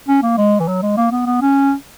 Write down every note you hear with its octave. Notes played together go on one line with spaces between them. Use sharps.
C#4
A#3
G#3
E3
F#3
G#3
A#3
B3
B3
C#4